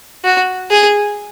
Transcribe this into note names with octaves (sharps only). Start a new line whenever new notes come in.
F#4
G#4